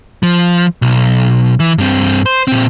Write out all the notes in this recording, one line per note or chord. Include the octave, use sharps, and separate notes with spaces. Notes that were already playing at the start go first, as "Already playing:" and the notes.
F3
B1
E3
G2 C4
C5
A#2 C4